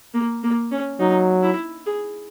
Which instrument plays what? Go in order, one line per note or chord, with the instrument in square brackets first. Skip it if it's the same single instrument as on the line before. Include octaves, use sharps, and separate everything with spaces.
[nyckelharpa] A#3
A#3
C#4
[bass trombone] F#3 [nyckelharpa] D#4
[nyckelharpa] E4
G#4